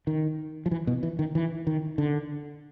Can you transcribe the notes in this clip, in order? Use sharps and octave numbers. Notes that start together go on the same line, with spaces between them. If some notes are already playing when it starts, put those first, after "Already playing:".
D#3
F3
E3
B2
E3
D#3
E3
D#3
D3